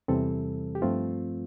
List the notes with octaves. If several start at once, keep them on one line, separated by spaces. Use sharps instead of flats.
E2 C3 E3 G3 C4 A4
G4
G2 F3 A3 C4 F4